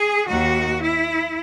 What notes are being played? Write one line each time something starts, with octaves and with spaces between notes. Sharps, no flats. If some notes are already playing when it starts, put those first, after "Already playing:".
Already playing: G#4
D#2 D#3 F#4
E4